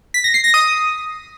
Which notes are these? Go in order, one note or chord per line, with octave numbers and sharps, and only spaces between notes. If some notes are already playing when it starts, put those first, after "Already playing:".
B6
A#6
C7
A#6
D#6